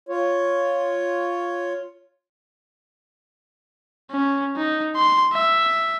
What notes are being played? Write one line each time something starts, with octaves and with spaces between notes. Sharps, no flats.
F4 C#5
C#4
D#4
C6
E5